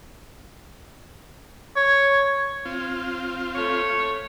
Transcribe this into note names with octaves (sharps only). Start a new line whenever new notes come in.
C#5
C4 F4
A3 C#5